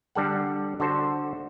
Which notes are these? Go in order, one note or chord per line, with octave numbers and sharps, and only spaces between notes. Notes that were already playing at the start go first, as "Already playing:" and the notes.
D3 G3 A4 F#5
D3 F#4 A4 C5